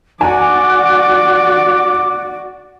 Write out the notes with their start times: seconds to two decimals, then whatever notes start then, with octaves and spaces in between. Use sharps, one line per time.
0.21 F#4 D5 F#5 G#5 D6